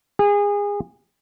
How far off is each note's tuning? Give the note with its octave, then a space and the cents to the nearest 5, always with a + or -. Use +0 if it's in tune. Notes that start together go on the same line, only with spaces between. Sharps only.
G#4 -25